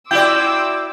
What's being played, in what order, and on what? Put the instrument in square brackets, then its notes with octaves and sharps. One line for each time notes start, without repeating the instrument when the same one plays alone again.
[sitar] E4 F#4 D5 [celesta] G5 [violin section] C6 D6 E6 [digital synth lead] G6